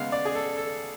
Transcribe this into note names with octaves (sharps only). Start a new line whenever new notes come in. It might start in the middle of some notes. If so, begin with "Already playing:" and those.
Already playing: C#3 G#3 B3 F5
D5
G#4
A4
A4